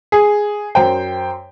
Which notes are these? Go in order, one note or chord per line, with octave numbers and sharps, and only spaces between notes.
G#4
F#2 C5 G5